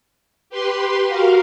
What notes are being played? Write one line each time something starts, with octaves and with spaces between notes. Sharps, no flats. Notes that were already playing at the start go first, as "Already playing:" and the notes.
G4 B4 C6
F#4 A#4 F5